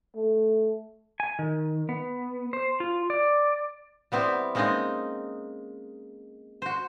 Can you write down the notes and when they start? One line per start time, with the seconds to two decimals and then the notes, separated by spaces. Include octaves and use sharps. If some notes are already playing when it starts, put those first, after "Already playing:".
0.15 A3
1.20 G#5
1.39 D#3
1.89 B3
2.53 C5
2.80 F4
3.10 D5
4.12 G3 B3 C4 E4
4.55 G#3 A#3 C4 C#4 D#4 D#5
6.62 F#4 C5